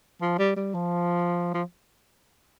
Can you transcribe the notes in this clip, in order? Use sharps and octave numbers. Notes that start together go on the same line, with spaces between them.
F3
G3
G3
F3
F3